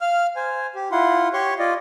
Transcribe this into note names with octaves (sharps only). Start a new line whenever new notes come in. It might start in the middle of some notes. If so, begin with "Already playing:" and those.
F5 F6
C5 G#5
G4
E4 F4 F#5 C6
G4 C#5 C6 C#6
F4 D5 D#5